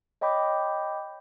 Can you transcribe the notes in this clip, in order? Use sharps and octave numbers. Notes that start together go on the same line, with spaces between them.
C#5 D#5 G5 B5 D6 G6